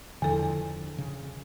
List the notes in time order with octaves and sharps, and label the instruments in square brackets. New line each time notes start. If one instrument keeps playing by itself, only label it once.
[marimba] E2 A4 [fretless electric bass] D3 F3
[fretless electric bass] C#3